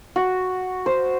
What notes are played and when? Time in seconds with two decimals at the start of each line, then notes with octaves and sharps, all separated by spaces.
0.16 F#4
0.86 C5